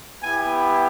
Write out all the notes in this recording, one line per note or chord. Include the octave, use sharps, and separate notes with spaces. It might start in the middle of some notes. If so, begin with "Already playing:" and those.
B3 E4 G4 G#5